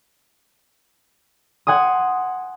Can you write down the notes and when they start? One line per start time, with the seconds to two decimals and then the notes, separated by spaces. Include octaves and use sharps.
1.67 F#5 G#5 C6 D#6